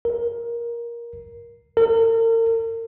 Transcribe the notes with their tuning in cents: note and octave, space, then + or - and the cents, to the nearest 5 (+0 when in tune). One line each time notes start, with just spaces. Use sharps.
A#4 +15
A#4 -40